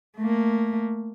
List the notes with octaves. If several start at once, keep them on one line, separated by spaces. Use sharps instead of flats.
A3 A#3